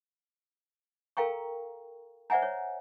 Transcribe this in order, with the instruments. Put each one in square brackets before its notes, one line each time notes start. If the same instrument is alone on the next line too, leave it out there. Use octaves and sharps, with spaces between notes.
[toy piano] A4 A#4 F5 G5 A#5 C#6
C5 D5 E5 F#5 G#5 A#5
C#5